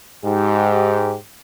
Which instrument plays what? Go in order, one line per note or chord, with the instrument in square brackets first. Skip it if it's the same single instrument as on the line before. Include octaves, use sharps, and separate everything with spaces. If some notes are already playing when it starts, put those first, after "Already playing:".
[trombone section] G#2 G4